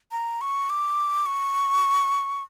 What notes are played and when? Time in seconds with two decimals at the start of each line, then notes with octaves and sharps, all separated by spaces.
0.12 A#5
0.41 C#6
0.70 D6
1.26 C#6